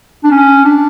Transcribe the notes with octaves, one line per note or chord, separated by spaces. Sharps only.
D4
C#4
D4